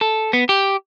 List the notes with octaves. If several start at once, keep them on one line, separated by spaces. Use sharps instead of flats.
A4
B3
G4